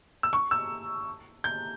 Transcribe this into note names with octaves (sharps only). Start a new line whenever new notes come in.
E6
C#6
E6
G6